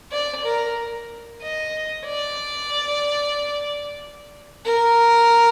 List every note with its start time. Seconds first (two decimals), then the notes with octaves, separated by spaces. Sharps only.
0.12 D5
0.44 A#4
1.42 D#5
2.06 D5
4.65 A#4